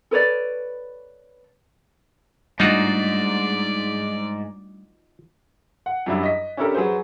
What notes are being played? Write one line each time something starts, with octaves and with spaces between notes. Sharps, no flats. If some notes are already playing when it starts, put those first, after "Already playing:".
A4 B4 C#5 D5
G#2 G3 A3 D4 D#4 F4 F#4 D5
F#5
F#2 F#3 G3 D4 E4
D#5 B6
C#4 D4 E4 G4 A4 A#4
F#3 G#4 B4 C5